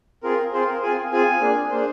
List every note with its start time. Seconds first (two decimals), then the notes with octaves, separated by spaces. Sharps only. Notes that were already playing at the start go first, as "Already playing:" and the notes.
0.23 C4 F4 G#4 A#4
0.53 C4 F4 G#4 C5
0.67 A#4
0.82 C4 F4 G#4 G#5
1.12 C4 F4 G#4 G#5
1.41 A#3 D4 G#4
1.71 A#3 D4 G#4 C5